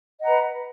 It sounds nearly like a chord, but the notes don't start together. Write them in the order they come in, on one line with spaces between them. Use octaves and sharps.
D#5 F#5 A#5 B4